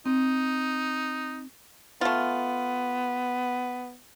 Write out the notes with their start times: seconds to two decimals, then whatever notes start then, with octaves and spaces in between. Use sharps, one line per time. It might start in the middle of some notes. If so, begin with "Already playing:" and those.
0.06 C4 D#4
2.01 A3 B3 F4